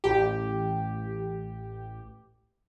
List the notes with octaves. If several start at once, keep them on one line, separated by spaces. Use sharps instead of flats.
A1 G4